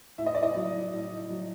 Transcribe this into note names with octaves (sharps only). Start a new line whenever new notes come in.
A2 E5
D#5
D5
D#5
F#3
A2
F#3